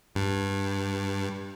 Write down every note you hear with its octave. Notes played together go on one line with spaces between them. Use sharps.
G2